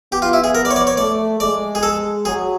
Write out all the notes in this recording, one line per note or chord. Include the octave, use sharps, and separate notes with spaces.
B3 G4
F4
E4
G#4
A#4
D5
C#5
D5
C#5
A3 D5
G#3 D5
G#4
A4
F#3 G#4